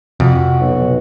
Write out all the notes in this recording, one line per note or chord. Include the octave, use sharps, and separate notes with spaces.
F2 C3 F#4
B1